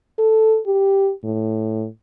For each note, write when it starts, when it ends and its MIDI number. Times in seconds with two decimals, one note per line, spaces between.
0.19 0.59 69
0.67 1.11 67
1.25 1.87 45